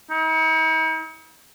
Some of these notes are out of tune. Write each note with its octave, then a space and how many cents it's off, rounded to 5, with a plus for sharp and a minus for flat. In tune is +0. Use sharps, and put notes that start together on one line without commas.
D#4 +45